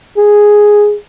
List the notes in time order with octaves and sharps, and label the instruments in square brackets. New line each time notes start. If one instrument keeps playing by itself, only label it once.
[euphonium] G#4